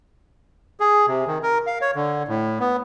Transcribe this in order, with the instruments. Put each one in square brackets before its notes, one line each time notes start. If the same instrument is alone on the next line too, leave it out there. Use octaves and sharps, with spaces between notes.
[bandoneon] G#4
C3
D#3
A#4
F5
C#5
D3
A2
B3